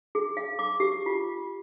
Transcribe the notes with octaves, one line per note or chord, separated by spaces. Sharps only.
G#4
F5
D6
G4
F4